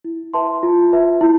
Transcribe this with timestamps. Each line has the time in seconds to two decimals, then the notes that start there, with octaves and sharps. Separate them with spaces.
0.05 E4
0.34 B4 E5 A5 C6
0.63 F4
0.92 B4 E5 A5
1.21 E4